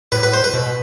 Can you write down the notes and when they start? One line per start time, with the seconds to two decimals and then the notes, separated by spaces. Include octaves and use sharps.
0.12 A2 B4
0.23 B4
0.33 C5
0.44 B4
0.54 B2